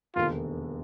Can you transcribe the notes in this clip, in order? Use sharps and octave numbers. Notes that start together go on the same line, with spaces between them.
E1 D#2 D3 F4